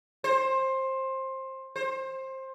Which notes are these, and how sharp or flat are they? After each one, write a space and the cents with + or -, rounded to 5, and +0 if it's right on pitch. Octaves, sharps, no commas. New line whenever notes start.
C5 +20
C5 +20